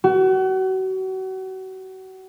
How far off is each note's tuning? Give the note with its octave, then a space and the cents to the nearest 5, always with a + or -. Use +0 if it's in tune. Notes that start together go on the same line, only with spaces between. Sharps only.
F#4 +35